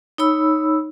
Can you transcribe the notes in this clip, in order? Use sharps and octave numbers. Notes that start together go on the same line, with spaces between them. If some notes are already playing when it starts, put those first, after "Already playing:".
D#4 C#5 B5 E6